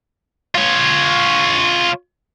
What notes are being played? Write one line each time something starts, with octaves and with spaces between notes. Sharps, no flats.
F4 C#5